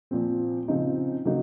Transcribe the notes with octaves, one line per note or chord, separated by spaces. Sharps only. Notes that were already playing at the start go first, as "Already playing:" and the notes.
A#2 F3 C4
C#3 F3 C4 D#4
C#3 F#3 A#3 D#4 F#4